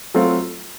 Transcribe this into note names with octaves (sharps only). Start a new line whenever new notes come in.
F#3 A3 C4 F4